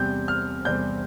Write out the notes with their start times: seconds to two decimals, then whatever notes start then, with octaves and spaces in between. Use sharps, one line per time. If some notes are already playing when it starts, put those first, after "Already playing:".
Already playing: E2 C3 G3 C4 G6
0.28 F6
0.65 E2 C3 G3 C4 G6